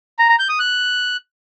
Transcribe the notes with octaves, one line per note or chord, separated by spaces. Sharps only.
A#5
A#5
G6
D#6
F#6